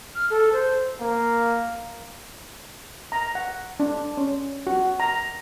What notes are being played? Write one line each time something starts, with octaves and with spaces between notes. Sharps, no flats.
F6
A4
C5
A#3
A#5
F#5
D4
C#4
F#4
A#5